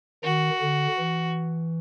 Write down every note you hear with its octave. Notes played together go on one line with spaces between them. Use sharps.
D#3 F#4
D3
E3